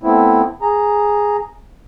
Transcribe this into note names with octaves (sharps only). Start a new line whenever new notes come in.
A3 B3 C4 E4
G#4 A#5